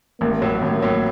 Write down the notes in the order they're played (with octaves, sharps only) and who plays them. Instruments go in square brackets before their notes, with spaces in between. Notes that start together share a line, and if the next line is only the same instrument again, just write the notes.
[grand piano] A1 [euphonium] A#3
[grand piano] A2 F#3
[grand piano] A1 [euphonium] A#3
[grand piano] A2 F#3